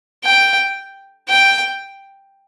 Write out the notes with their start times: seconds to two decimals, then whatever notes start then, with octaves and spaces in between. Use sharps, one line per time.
0.24 G5
1.29 G5